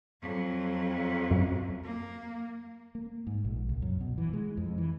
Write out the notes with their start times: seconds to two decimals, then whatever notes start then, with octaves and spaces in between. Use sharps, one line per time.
0.21 F2 F#3
1.31 F#2
1.83 A#3
2.95 A#3
3.27 G#2
3.44 A#1
3.69 C2
3.82 F#2
4.01 B2
4.18 E3
4.33 G#3
4.57 F2
4.78 E3